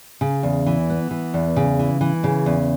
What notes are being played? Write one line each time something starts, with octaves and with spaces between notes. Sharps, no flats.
C#3
E2
E3
B3
E3
E2
C#3
E3
E3
C#3
E2